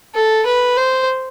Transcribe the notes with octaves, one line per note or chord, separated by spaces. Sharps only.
A4
B4
C5